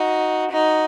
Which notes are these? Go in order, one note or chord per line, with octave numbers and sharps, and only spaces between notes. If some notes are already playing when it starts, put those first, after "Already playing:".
Already playing: D#4 F#4
D#4 F#4